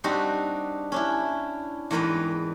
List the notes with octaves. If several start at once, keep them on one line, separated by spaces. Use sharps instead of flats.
G3 C4 D4 D#4 F#4 G4
C#4 D4 E4
E2 G#2 A#4 B4 G5 A#5